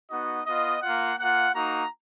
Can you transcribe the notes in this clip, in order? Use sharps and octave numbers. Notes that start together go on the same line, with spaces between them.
B3 D#4 F#4 D#5
B3 F4 D#5
A#3 F4 F#5
A#3 F4 F#5
A#3 D#4 F#4 A#5